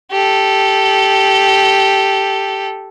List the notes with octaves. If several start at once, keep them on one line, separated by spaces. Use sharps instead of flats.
G4 A4